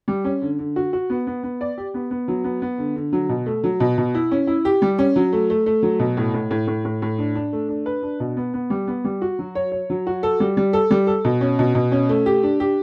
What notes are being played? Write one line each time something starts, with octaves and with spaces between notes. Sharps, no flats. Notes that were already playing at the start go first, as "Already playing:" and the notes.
G3
C#4
D3
D3
F#4
F#4
B3
B3
B3
D5
G4
B3
B3
F#3
B3
B3
D3
D3
F#3
B2
A3
F#3
B2
B2
E4
C#4
E4
G4
G3
C#4
F#3
A3
A3
A3
F#3
B2
A2
A2
A2
A2
A2
A2
D4
D4
A3
D4
B4
D4
B2
B3
B3
G3
B3
G3
F#4
F#3
C#5
C#5
F#3
F#4
A4
G3
G3
A4
G3
A4
B2
C#4
B2
B2
C#4
A3
G4
D4
G4